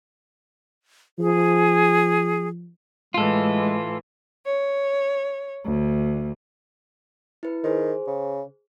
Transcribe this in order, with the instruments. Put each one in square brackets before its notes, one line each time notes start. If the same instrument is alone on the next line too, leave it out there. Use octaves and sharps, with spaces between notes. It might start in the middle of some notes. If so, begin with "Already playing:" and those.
[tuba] F3 [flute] G#4
[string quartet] A2 E3 [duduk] G#3 [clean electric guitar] F4 A4
[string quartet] C#5
D2
[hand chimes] E4 B4
[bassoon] D#3 [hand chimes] G#4 C5
[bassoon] C#3